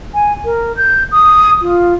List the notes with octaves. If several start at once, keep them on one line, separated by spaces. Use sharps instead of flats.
G#5
A#4
G6
D#6
F4